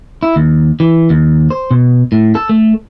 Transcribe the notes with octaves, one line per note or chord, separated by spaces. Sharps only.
E4
D#2
E3
D#2
C5
B2
A2
A4
A3